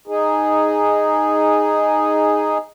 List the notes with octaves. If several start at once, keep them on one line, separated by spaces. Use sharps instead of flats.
D#4 G#4